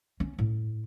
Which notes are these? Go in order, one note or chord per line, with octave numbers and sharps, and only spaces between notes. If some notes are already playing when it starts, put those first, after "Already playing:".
C#4
A2